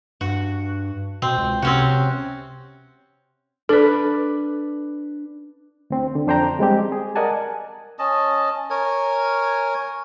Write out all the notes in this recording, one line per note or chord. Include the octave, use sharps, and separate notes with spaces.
G2 F#4
B2 C4
C#2
C3 C4 C#4 F#4
D4 A4 B4
D2 C4
D3
F2 D4 C5 G5 A#5
G3 G#3 C4 G4
G#4
A#4 D5 D#5 F#5 G#5 A5
C#4 D#5 A5
A#4 C#5 G#5